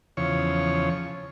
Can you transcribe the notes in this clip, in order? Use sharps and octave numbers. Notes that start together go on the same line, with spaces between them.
E2 C#3 F3 C#5